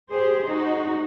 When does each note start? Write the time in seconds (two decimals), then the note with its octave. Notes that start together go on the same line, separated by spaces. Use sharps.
0.11 G4 G#4 C5
0.49 D#4 F#4